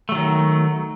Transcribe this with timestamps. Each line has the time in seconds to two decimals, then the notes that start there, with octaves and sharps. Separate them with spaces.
0.09 A3
0.12 F#3
0.15 D#3